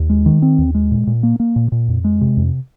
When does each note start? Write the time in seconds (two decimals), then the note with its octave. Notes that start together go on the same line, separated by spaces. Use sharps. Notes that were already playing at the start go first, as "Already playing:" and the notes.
Already playing: D#2
0.10 G#3
0.26 D#3
0.42 C4
0.58 D#2
0.75 G#3
0.91 A#2
1.07 A#2
1.23 A#3
1.40 A#3
1.56 A#2
1.72 A#2
1.88 F2
2.04 G#3
2.21 C3
2.37 F2